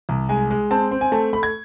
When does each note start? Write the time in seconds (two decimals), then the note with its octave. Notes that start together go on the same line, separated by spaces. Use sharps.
0.09 C2
0.29 G#3 G#5
0.51 G#3
0.71 C4 A5
0.91 C4
1.01 G#5
1.12 A3 A5
1.33 A3 B5
1.43 G#6